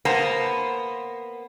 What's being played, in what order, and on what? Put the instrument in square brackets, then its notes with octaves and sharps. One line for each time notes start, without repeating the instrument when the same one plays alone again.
[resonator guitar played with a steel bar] A#3 B3 C5 A5